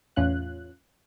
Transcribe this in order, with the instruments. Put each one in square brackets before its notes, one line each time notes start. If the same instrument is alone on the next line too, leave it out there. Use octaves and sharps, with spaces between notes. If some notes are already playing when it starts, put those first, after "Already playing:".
[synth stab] E2 A2 C#4 F4 F#6